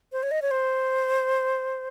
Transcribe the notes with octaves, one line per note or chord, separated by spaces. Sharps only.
C5
C#5
D#5
C#5
C5